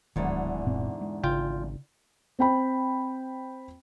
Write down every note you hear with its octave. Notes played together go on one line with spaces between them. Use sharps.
D1 E2 G#2 D3 D#3 F#3
F#2 A#2 C4
G#3
G#1 C#3 F4 G5
C4 G5 B5